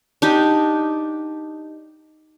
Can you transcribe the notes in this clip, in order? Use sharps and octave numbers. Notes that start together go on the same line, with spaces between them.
D4 D#4 G4